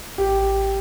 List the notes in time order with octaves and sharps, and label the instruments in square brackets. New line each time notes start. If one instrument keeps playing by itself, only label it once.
[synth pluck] A1 [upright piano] G4